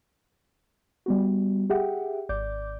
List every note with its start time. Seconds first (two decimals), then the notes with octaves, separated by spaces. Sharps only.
1.06 G3 B3 F#4
1.70 G4 G#4 E5 F#5 G5
2.29 G#1 D5 D6 G6